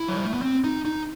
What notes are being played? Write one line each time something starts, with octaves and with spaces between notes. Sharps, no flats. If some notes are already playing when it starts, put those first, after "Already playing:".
Already playing: E4
F#3
G3
A3
B3
C4
D#4
D#4